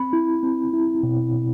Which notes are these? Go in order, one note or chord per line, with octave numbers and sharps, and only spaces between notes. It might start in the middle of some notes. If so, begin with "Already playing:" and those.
Already playing: C4 B5
E4
C4
E4
B2
B2